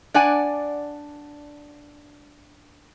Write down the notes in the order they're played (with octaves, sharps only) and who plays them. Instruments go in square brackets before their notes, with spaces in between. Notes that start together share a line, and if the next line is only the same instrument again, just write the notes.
[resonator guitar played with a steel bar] D4 D5 F#5 G#5